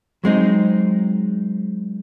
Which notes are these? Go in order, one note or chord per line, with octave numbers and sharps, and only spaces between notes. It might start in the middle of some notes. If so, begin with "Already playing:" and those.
F#3 G#3 C4 D#4